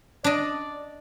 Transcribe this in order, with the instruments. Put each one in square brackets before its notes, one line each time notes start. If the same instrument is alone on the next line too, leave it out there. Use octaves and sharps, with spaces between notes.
[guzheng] D4 D#5 [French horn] D5